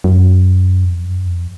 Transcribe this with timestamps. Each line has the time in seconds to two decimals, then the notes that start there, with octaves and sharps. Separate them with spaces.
0.04 F#2
0.85 F2
1.05 F#2
1.26 F2